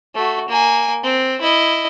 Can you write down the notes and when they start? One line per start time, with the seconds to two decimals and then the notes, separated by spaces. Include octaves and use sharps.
0.15 A3 F#4
0.49 A#3 G#5
1.04 C4
1.41 E4 D#5